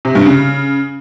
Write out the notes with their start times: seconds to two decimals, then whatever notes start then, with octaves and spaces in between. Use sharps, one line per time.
0.05 C3
0.15 G2
0.25 C#3